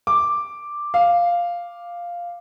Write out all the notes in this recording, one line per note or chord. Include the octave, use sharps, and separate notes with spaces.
D6
F5